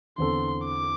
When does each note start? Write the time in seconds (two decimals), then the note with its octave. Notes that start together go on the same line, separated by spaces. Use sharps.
0.18 E2 D3 C4 A4 C6
0.65 D6